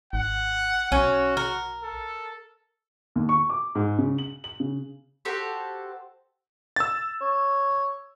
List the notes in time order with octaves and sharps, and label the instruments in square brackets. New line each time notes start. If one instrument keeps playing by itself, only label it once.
[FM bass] G#1 [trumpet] F#5
[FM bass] B1 [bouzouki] C#4 [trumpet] F#4
[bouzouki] A#4
[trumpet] A4
[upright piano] D#2
C#6
D6
G#2
C#3
F#7
F#7
C#3
[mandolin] F#4 G4 A4 C5
[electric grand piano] E6 A6
[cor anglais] C#5